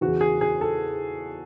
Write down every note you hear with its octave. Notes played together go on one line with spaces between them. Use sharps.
E2 C#3 E3 F#4
G#4
G#4
A4